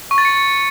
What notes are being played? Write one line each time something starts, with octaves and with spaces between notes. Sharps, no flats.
C#6
A6
C#7